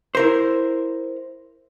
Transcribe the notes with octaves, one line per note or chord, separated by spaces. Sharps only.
E4 A#4 C5